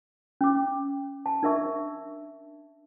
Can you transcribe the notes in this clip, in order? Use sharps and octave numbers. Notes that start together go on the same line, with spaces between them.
C#4 D6
A5
D4 A#4 E5 C#6